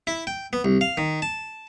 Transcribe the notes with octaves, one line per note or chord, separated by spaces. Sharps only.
E4
G5
B3
C2
F5
D#3
A5